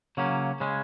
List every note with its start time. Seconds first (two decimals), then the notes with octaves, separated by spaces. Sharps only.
0.17 C#3 F#3 A#3 C#4
0.60 C#3 G#3 C#4